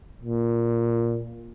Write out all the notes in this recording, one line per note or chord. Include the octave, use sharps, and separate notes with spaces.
A#2